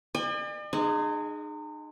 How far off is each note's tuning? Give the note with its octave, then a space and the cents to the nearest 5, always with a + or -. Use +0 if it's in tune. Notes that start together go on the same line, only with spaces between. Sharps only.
D5 +45 G#5 -45
G#3 +5 D#4 -35